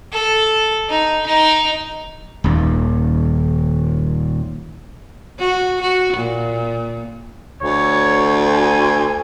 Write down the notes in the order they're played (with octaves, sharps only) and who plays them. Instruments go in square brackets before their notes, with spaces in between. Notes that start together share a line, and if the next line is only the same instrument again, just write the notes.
[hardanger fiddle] A4
D#4
D#4
[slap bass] D#1 D#2
[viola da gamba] F#4
F#4
A#2
[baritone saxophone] D2 [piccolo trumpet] C#5
[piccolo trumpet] G#5